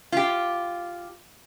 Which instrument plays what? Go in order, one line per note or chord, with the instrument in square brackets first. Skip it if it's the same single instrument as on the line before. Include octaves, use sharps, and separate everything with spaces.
[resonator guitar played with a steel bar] F4 G4